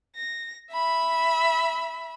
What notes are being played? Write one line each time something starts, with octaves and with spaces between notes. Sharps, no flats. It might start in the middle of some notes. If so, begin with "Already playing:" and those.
A#6
E5 B5